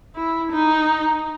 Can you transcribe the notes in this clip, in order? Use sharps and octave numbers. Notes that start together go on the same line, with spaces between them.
E4
D#4